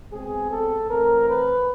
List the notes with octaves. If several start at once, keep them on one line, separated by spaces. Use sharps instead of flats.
B2 G#3 C4 G#4
A4
E3 A3 C4 A#4
B4